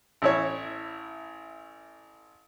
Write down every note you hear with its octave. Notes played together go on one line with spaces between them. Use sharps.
A1 E4 C#5